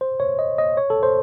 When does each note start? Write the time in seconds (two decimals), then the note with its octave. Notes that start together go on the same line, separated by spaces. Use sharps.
0.01 C5
0.20 C#5
0.39 D#5
0.58 D#5
0.77 C#5
0.90 A4
1.03 C5